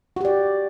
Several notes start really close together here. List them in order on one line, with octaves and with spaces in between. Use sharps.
F#4 G4 D5